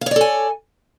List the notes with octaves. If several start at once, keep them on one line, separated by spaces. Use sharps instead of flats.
A4 C#5 D5 F5 G#5